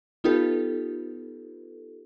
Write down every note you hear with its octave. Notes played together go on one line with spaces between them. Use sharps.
B3 D#4 F4 G4 A4 B4